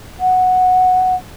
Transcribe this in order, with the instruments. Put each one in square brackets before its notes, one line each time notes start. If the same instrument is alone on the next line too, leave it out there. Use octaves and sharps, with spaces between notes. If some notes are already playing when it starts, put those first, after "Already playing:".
[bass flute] F#5